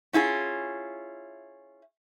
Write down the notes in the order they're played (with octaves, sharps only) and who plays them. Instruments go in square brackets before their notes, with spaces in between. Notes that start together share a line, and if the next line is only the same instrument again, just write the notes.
[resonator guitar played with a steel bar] C#4 E4 F4 G#4